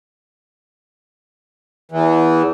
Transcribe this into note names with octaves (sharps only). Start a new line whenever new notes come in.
E2 E3